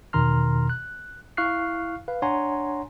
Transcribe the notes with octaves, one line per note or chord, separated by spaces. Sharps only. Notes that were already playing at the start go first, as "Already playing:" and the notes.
E2 B2 D#3 A#5 C6 F6
F#6
E4 F5 C#6 F6 F#6 C7
B4 F5
D4 C#5 F#5 G#5 A#5 C6